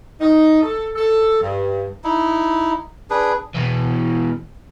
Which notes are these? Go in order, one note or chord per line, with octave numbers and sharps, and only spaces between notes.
D#4
A4
A4
G2
D#4 E4
D4 G#4 B4
B2 E3